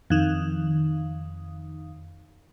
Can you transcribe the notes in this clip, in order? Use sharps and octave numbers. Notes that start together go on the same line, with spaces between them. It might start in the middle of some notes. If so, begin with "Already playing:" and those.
F2 D#3